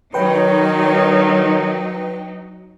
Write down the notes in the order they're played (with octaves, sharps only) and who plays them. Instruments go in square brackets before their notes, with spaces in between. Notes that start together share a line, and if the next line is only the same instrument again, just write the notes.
[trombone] D#3 [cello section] F#3 D#4 [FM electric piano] B4 G5 [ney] C#5